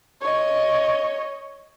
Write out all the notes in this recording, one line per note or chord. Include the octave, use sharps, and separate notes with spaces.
C#5 D#5